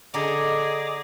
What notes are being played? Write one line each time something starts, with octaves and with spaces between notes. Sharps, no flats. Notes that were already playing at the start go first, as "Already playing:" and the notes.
D3 G#4 A4 D#5 A#5 D6